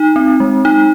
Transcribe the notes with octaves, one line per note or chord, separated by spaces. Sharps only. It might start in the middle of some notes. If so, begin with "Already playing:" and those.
Already playing: D#4
C4
G#3
D#4